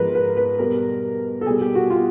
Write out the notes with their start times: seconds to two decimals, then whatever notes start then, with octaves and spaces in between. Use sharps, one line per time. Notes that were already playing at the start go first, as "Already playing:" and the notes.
Already playing: G#2 F3 A#4 B4
0.15 B4
0.37 B4
0.59 B2 G3 A#4
1.41 A4
1.46 B2 G3 G#4
1.61 G4
1.75 F#4
1.90 F4